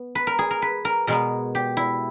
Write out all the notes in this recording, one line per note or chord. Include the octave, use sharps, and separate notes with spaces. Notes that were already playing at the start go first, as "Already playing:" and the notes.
Already playing: B3
B4
A#4
G#4
A#4
B4
A#4
B2 G#3 B3 A#4
G4
E4